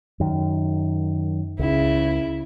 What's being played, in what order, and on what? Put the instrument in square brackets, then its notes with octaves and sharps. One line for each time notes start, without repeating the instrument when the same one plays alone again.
[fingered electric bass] F#2 D#3
[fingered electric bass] C#2 [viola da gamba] C#3 E4